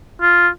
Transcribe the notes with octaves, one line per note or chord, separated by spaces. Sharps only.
F4